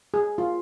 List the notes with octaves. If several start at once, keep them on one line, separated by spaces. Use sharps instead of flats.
G#4
F4